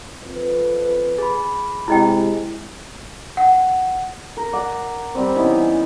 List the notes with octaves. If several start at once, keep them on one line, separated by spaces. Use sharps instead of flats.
F2 B4
G#4 B5
C3 G#3 E4 D#5 G5
F#5
A#4
D5 F#5
G3 C4
E3 B3 C#4 D#4